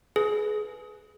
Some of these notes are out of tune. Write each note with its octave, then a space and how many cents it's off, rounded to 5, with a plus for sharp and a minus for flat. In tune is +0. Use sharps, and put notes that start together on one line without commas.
G#4 +30 B4 +0